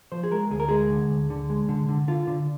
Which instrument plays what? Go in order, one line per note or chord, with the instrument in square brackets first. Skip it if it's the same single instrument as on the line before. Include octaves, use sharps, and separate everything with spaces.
[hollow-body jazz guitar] F3 C5
G#4
G#3 A#4
D2 G#4
A#4
G#3 G#4
D3
D2
D3
G#3
D3
D3
D3 F4
D3